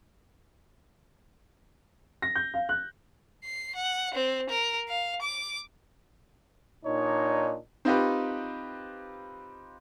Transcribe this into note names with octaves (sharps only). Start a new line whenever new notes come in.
A#6
G6
F5
F#6
C7
F#5
C4
A#4
F5
D6
A#2 D4 D#4 C#5
C4 D#4 F4 G4 B4